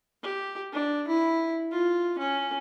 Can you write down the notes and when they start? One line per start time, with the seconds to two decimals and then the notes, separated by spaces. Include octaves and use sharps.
0.23 G4
0.73 D4
1.08 E4
1.72 F4
2.19 C#4